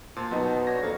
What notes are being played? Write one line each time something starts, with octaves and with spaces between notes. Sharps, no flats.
A#2 C5 A5
B2 F#3 B3 D#4
D4 F#4 C#5 A#6
F2 A#3 F5 C#6